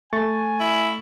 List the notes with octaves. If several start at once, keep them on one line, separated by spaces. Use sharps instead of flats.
A3 G#5 C#6 A6
E4